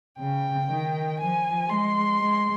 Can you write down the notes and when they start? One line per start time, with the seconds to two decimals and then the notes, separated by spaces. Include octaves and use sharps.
0.19 C#3 G5
0.70 D#3
1.19 F3 G#5
1.69 G#3 C6
2.19 G#3